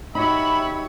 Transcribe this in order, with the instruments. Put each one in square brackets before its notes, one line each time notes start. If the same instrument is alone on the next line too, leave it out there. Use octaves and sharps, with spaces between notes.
[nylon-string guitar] D#4 F#4 [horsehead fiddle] G4 C#5 [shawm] E5 [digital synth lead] B5